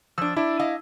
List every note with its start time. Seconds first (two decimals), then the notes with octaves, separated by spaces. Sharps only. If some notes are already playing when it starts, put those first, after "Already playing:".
0.18 F3 D4 E6
0.36 D4 E4
0.59 D#5 F5